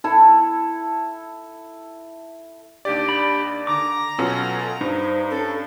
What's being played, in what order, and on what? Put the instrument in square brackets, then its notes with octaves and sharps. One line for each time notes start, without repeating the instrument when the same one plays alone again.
[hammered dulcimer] E4 A4
[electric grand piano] D#2 D5 [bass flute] D4 [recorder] G4
[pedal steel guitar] B5
[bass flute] D3 [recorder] A#5 [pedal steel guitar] D6
[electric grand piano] B2 C#4 F4 [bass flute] F#3 [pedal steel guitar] A4
[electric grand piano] G2 [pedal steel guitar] D#4 [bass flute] C5
[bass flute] C#4 [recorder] A4